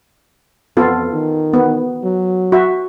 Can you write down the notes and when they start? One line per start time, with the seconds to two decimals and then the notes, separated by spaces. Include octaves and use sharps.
0.77 F2 B3 F4 A4
1.13 D#3
1.54 B3
2.03 F#3
2.52 F#4 E5